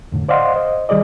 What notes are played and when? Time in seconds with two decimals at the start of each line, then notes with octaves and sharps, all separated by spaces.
0.12 F2 A2 D3
0.29 C5 D5 D#5 F5 F#5 C6
0.56 C5 D#5
0.89 D#3 G3 G#4 D5 D#5